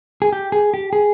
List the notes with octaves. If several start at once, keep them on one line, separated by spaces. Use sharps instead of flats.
G#4
G4
G#4
G4
G#4